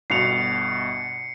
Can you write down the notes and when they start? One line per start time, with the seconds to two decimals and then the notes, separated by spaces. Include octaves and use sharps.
0.10 G1 B2 C7 C#7 F7